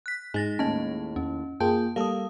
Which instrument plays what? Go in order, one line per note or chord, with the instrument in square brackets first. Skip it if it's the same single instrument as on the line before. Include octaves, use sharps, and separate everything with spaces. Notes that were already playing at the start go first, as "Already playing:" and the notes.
[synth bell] F#6 B6
[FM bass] G#2 [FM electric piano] G#3 [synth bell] D#4 A6 A#6
[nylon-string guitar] D#2 A2 [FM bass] C#4 [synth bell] D#5 A5
[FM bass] E2 [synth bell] C#4
[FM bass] F#2 [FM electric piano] A#3 F4 G5 [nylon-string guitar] G#4 [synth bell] A5
[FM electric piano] G3 A4 [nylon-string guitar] A#3 [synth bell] F5 D#6